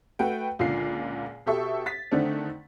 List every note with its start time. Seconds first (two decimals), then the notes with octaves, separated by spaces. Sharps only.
0.19 A3 F#4 B4 G5
0.59 C#2 A#2 D3 F4 C7
1.46 B2 G4 A4 E5 C#6
1.86 A6 B6
2.11 D3 D#3 A3 C4 D4